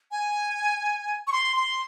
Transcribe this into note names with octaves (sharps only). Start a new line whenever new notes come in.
G#5
C#6
C6
C6